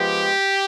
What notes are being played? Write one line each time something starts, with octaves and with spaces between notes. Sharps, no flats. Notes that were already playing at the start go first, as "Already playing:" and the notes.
Already playing: F3 G#3 B3 G4